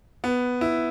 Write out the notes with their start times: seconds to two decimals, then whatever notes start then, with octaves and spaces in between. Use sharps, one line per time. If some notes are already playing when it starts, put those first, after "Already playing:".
0.24 B3
0.61 E4